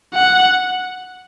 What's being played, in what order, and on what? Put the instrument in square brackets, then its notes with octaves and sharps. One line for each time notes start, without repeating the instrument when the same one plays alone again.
[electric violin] F#5